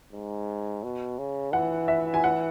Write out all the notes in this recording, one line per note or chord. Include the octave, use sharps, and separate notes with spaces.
G#2
B2
C#3
E3 F#5
E5
G#5
F#5